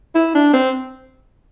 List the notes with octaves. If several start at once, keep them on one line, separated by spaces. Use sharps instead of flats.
E4
D4
C4